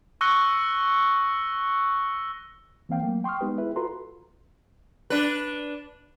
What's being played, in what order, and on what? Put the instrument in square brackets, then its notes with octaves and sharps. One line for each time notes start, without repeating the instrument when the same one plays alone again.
[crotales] C#6 E6 F#6 A#6 C#7 G7
[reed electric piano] E3 A#3 C4 F5 G5
F#3 A3 A#3
G5 C6 C#6 D#6 F6
G#3 B3 D#4 G4 B4
E4 G#4 B4 E5
F4 F#4 A4 B4 A#5 C6
[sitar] D4 B4